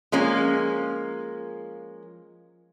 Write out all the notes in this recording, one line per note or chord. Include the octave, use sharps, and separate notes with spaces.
F3 G#3 A#3 C#4